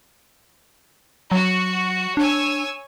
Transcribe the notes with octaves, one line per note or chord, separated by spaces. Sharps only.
F#3 F#4
D4 C#5 G#5 E6